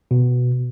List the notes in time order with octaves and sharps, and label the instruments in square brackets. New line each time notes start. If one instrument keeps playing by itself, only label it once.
[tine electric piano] B2